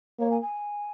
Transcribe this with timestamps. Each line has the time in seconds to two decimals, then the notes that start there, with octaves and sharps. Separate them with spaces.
0.19 A#3 C#5
0.31 G#5
0.41 G#5